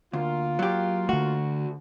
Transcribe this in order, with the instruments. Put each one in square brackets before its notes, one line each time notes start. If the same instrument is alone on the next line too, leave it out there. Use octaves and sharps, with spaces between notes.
[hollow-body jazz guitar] D2 [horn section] A#3 F4
[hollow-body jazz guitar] F#3 G4
[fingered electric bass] D3 A3 [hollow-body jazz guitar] F#4